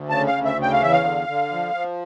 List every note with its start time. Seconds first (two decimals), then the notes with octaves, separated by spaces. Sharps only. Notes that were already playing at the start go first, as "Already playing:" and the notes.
Already playing: D2
0.09 C#3 A5
0.27 F5
0.33 D2
0.45 E5
0.57 C#3
0.62 G5
0.72 F5
0.80 E2 E5
0.93 F5
1.04 D3
1.27 D3
1.52 F3
1.74 F3